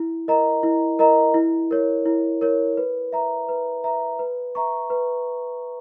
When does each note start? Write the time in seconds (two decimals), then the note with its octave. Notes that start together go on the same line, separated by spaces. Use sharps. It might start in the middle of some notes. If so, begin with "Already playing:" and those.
Already playing: E4
0.28 A#4 D#5 A#5
0.63 E4
0.99 A#4 D#5 A#5
1.34 E4
1.71 A#4 C#5
2.05 E4
2.41 A#4 C#5
2.77 B4
3.12 E5 A#5
3.49 B4
3.84 E5 A#5
4.19 B4
4.55 E5 A#5 C#6
4.90 B4